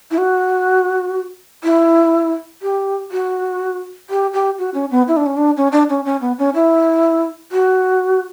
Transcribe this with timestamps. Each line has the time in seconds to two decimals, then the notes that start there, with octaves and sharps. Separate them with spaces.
0.11 E4
0.18 F#4
1.64 E4
2.62 G4
3.11 F#4
4.10 G4
4.33 G4
4.58 F#4
4.74 C#4
4.91 B3
5.08 E4
5.17 D4
5.26 C#4
5.37 D4
5.57 C#4
5.72 D4
5.90 C#4
6.05 C#4
6.21 B3
6.39 C#4
6.55 E4
7.52 F#4